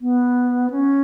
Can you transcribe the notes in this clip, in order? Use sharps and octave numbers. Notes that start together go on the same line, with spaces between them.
B3
C#4